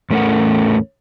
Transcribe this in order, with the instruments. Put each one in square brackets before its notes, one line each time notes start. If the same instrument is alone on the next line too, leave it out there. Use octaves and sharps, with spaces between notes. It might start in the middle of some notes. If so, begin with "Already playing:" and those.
[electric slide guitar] E2 A2 A3 C#4 A#4 F#5